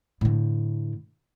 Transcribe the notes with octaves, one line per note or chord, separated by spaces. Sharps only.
A2 D3